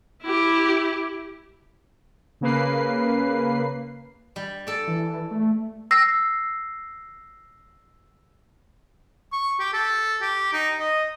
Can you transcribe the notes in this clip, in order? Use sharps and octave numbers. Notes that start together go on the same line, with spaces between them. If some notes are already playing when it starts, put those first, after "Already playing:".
E4 G4
C#3 A#3 B4 C7
G3
A4 D5
E3
A3
E6 A#6 C7
C#6
G4
A4
G4
D#4
D#5